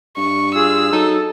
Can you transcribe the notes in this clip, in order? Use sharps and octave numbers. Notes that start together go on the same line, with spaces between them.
G2 C#6
F4 G#4 E6
F#3 D#4 A4